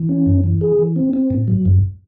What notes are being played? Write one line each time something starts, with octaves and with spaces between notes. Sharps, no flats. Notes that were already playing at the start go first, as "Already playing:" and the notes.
Already playing: E3
C#4
F#2
E3
G#4
E3
C4
C4
A2
F#3
F#2